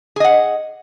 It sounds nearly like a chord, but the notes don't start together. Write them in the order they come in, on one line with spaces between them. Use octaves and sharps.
G#4 D#5 F#5